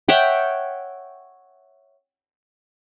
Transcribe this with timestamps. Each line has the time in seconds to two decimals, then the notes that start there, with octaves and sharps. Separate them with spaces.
0.08 C#5 E5 F#5 G5